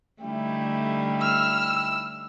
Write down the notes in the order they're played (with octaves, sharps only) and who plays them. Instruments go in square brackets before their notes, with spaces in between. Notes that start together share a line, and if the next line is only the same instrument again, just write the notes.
[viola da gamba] D3 G3 A3 [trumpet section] D#4 E4 G5
[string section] E6 [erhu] F6